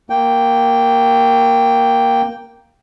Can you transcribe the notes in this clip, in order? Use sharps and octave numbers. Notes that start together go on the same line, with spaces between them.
A#3 G5